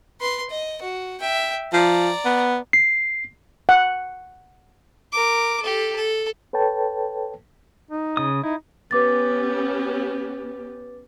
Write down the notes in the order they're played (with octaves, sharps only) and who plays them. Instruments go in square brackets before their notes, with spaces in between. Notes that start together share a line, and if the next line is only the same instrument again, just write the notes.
[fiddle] B4 C6
D#5
F#4
E5 G5
[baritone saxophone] F3 [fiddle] D5 A#5
[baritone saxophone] B3
[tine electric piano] C7
[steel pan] F#5
[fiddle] A#4 D6
G4 A4
A4
[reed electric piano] A4 B4 C#5 G5 A5
[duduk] D#4
[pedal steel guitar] C#3 D#6
[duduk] D#4 [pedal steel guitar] E4
[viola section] B3 C#4 G4 [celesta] B4 D6 A6